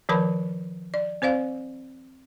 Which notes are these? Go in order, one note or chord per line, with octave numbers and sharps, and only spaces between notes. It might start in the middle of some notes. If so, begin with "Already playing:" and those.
D#3 F3 A#4 B4 A5 B5
D5
C4 C5 D5 F5